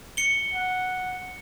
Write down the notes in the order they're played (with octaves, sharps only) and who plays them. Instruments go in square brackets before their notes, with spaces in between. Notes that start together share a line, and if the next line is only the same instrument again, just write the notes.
[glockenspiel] C#7 G7
[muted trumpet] F#5